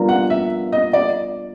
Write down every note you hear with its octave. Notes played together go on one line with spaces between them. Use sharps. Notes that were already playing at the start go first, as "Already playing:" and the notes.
Already playing: G3 B3 D4 F4 A#4
F#5
E5
D#5
D5